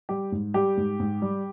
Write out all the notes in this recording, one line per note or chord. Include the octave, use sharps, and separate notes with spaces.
G3 G4
G#2
G3 G4
G#2
G#2
G3